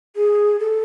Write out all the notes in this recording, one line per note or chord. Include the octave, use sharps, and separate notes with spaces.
G#4
A4